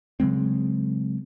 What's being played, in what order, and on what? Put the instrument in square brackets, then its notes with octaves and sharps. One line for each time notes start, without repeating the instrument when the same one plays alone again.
[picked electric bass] C#3 F#3 G#3 C4